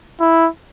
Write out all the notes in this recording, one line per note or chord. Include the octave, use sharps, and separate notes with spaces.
E4